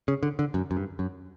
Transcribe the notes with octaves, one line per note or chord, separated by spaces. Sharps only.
C#3
D3
D3
F#2
F#2
G2
F#2